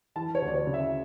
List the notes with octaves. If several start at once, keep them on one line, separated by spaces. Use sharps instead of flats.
E3 A5
C#5
D2
D5
C#5
C#3
E5